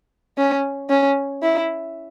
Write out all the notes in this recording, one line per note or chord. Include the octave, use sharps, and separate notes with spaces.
C#4
C#4
E4